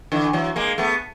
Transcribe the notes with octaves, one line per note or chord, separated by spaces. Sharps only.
D3 E3
E3 F#3
G#3 A#3
A3 B3